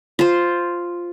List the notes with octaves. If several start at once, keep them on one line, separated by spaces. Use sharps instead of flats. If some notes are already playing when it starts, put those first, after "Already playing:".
F4 C5